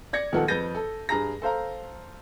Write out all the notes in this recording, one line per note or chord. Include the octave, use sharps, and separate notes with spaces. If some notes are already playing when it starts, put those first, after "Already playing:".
D5 G#6 A#6 C#7
D#1 D#3 F3 B3 A4 F#5
F2 B4 G6 A6 A#6 D#7
A4
G2 G#4 A#5 A#6
A4 C5 F5 A#5